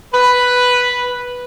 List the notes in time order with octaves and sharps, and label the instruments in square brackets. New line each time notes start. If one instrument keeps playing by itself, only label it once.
[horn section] B4